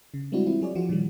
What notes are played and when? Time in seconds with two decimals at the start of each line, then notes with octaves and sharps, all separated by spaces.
0.14 C#3
0.32 G3 G#3 C4 D4 E4 F#4
0.46 E3 C4 E4 F4
0.62 F#3 G#4 C#5 D5
0.75 E3 F3 F4 F#4
0.89 A#2 D#3 E3 G3